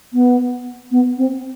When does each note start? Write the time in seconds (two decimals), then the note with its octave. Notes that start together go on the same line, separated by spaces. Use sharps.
0.13 B3
0.91 B3
1.18 C4